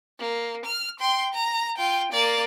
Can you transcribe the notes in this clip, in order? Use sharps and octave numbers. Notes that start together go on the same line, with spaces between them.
A#3
F6
G5 C6
A#5
F4 G5
A#3 D5